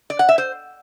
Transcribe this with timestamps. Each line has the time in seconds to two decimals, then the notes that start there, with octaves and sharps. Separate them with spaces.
0.10 D5
0.19 F#5
0.29 E5
0.38 C5